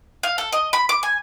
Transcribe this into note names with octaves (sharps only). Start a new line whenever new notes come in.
F5
A4
D#5
B5
D6
G#5